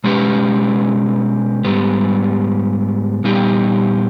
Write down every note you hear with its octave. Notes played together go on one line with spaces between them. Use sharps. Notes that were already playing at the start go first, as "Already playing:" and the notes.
B2 G#3 C#4 G4 B4
G#2 G3 B3
A#2 G3 B3 D#4 G4